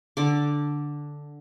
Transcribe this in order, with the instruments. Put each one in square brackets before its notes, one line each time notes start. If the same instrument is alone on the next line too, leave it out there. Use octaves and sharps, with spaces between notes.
[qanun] D3 D6